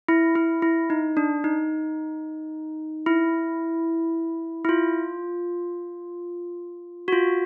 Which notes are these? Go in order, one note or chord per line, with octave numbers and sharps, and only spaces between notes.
E4
E4
E4
D#4
D4
D#4
E4
E4
F4
F#4
F4